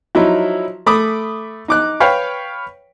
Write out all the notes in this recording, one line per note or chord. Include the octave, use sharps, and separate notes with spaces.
F3 F#3 D#4 E4
A3 B5 D6 D#6
D#4 D6 F#6
B4 C#5 F5 G5